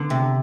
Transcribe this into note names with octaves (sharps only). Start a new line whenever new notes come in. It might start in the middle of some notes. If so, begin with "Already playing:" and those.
Already playing: D3 B3
C3